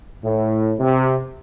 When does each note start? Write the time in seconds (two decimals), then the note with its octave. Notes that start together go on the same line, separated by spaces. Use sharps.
0.25 A2
0.80 C3